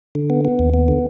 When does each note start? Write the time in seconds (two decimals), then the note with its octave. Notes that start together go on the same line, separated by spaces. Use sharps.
0.15 D3
0.30 B3
0.45 B3
0.59 D#2
0.74 B3
0.88 D3